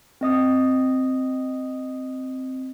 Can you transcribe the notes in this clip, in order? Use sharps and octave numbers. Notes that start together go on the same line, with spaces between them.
C4 D#5 D#6